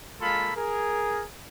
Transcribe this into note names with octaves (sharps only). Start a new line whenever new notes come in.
G#3 A#3 F4 A4 B5
G#4 A#4